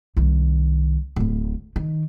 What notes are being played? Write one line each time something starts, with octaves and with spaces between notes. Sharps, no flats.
C2 D#3
D1 A2
D#3